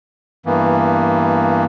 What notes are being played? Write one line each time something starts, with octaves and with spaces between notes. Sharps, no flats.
G2 E3 A#3 B3